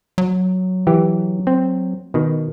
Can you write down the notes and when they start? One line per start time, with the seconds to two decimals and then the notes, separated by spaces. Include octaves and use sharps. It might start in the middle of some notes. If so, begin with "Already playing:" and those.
0.18 F#3
0.87 E3 G4
1.47 C4
2.14 B2 D#3